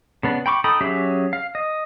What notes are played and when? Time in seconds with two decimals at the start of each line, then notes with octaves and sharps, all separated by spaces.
0.23 C#3 B3 D4
0.46 G5 B5 C#6 D6
0.64 D#4 A4 G5 B5 D#6
0.81 F#3 C#4 G4 G#4 E5
1.33 F5
1.55 D#5